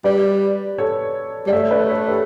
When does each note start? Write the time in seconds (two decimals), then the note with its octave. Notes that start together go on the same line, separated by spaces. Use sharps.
0.04 G3 B4 D5
0.78 A4 C#5
1.47 G3 D5
1.52 A3 C#5 E5
1.71 B4 D5
1.90 A4 C#5
2.08 G4 B4